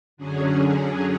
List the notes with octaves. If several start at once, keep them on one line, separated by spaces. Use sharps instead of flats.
F#2 D3 F#3 C#4 G#4